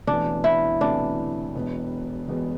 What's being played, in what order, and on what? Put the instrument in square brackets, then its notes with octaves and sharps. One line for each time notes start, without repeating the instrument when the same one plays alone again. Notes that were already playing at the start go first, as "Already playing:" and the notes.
[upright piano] E1 D2 C3 E3 B3 [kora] D4
[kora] E4
[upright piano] E1 D2 C3 E3 B3 [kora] D4
[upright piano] E1 E2 B2 B3
E1 E2 B2 B3